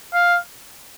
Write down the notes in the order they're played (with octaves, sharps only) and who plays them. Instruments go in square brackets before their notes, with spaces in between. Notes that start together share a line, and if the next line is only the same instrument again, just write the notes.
[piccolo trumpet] F5